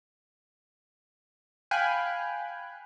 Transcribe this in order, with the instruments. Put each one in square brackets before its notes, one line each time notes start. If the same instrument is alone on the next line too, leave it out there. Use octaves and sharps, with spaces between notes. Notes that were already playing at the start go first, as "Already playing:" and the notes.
[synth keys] F5 G5 G#5 B5 F#6